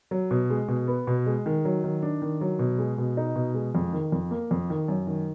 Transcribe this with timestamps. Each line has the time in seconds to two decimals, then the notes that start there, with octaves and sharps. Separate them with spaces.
0.11 F#3
0.31 B2
0.50 G#3
0.68 B2
0.88 B3
1.07 B2
1.26 G#3
1.46 D#3
1.65 F#3
1.84 D#3
2.02 D4
2.22 D#3
2.41 F#3
2.59 B2
2.78 G#3
2.98 B2
3.17 D#4
3.36 B2
3.54 G#3
3.75 F2
3.93 D#3
4.12 F2
4.31 A#3
4.51 F2
4.70 D#3
4.88 F#2
5.07 D#3